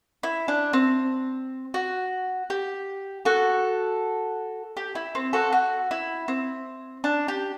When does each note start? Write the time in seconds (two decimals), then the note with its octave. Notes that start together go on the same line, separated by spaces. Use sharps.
0.23 E4
0.48 D4
0.73 C4
1.74 F#4
2.50 G4
3.25 F#4 A4
4.77 G4
4.95 E4
5.15 C4
5.33 F#4 A4
5.53 F#4
5.91 E4
6.28 C4
7.04 D4
7.28 G4